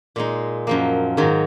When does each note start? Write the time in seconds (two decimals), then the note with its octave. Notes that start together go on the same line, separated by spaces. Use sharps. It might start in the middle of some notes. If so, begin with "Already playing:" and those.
0.16 A#2 G#3 D#4
0.67 F#2 F3 A#3
1.17 G#2 D#3 F#3